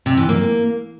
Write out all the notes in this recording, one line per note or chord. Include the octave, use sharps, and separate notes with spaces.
C3
E3
A#3